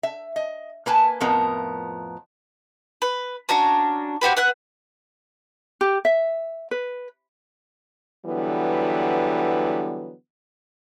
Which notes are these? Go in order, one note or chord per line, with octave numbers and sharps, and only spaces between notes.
E5
D#5
A#3 B4 G#5 A5
F2 A2 F3 B3 A#4
B4
C#4 D4 F#4 A#5
C4 F#4 G4 B4
B4 E5 F#5 F#6
G4
E5
B4
D3 E3 F#3 G3 B3